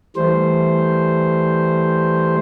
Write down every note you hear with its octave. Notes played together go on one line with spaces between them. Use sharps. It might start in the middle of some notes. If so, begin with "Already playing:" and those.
E3 G3 A3 C5